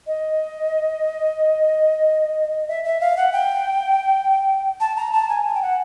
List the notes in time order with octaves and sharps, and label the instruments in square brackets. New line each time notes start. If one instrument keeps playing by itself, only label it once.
[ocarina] D#5
E5
E5
F5
F#5
G5
A5
A#5
A5
G#5
G#5
G5
F#5